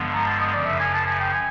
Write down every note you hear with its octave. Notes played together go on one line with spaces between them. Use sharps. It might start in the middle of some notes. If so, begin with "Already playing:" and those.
Already playing: G2 D3 F3 G#3 B3
A#5
A5
D#5
F#2 C#3 F3 D5
E5
G#5
A5
G#5
G5
G#5